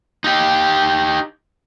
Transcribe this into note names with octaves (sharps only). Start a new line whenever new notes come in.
D#4 G4